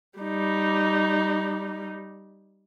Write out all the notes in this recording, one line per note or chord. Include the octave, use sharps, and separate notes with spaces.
G3 D#4